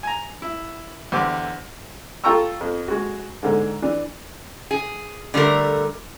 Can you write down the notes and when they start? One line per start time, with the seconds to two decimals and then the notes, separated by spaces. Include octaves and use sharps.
0.03 G#5 A#5
0.42 E4
1.12 E2 D3 G4 C5 D6
2.24 F4 A4 G5 A#5 C#6 E6
2.61 F2
2.88 G#3 F#4
3.43 G#2 D3 G#3
3.82 E3 D4
4.71 G#4
5.34 D3 G3 A3 A#4